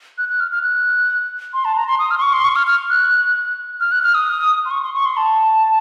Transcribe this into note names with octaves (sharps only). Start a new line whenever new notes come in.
F#6
F#6
F6
F6
F#6
C6
A5
A#5
C6
D#6
F6
C6
C#6
C6
C#6
F6
F6
F#6
F6
F#6
F6
D#6
C6
C#6
C6
C#6
C6
A5